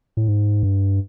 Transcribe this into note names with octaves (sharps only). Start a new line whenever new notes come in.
A2
G#2
G2